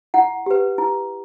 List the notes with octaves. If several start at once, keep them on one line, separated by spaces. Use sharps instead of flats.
E4 F#5
G4 B4
E4